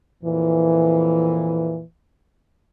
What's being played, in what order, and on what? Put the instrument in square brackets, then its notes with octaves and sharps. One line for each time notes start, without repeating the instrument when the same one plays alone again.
[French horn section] F2 A#2 E3